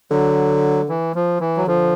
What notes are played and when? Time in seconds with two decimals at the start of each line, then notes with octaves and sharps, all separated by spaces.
0.11 D3 F#3
0.89 E3
1.15 F3
1.40 E3
1.57 F#3
1.67 D3 F3